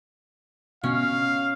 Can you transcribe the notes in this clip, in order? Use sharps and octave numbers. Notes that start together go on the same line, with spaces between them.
B2 C#4 F5